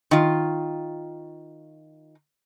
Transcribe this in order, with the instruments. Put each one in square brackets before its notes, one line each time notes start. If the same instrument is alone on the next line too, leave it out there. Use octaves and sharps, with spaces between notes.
[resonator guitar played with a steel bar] D#3 F4